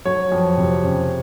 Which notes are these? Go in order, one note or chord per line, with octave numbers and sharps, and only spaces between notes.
F#3 C#5
F2
C3
C#3